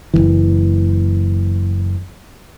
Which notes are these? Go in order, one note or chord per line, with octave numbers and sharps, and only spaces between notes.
F#1 B1 E3